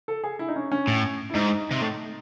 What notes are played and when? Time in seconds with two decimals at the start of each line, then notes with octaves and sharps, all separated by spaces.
0.08 A4
0.24 G#4
0.39 E4
0.48 D#4
0.56 C#4
0.72 C#4
0.87 A2
1.30 E4
1.34 G#2 D#4
1.71 C3
1.81 A2